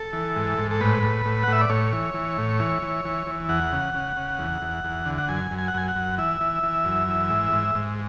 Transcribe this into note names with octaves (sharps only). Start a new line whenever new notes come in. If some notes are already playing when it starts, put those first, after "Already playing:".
Already playing: A4
E3
G#2
G#2
A4
A2 B4
A2
A2
F#5
A2 E5
D5
A2 C#5
E3
E3
A2
E3
E3
E3
E3
E2 F#5
C#3
C#3
C#3
E2
E2
E2
D3
F#5
F#2 G#5
F#2
G#5
F#5
F#2 G#5
F#5
F#2
E3 E5
E3
E3
F#2
E3
G#2
G#2
G#2